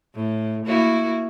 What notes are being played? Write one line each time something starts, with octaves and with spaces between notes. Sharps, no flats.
A2
A#3 E4 F#4